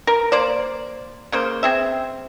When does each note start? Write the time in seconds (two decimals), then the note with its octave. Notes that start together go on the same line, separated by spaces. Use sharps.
0.07 A#4
0.32 A#3 C5 D5
1.32 C#3 A#3 C5
1.63 C4 G#4 E5